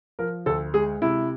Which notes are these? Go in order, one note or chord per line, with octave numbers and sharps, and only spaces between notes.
F3 A#4
D2 A4
G#3 G#4
C3 E4